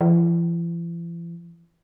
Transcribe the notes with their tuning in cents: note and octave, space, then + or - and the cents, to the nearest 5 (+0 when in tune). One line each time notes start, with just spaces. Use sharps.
E3 +45